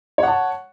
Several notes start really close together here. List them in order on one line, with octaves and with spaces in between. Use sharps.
C#5 F#5 A5